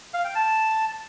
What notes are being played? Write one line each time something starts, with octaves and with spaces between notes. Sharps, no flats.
F5
G5
A5